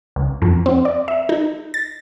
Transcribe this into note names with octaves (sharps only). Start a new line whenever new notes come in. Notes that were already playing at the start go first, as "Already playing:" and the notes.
C#2
F2
C4
D5
E5
D#4
A6